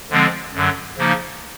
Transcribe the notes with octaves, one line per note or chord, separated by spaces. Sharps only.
D3 F3 G#3 C4
F#2 D3 F#3
C#3 F3 A#3 D#4